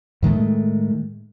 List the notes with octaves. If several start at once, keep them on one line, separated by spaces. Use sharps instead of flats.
A2 D#3 G#3 A3